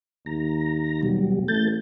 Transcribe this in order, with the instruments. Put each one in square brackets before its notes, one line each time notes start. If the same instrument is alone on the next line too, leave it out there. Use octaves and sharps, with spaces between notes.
[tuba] D#2 [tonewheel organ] A#5
[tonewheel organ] B2 F#3 G3
[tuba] A1 [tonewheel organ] A3 G6 A6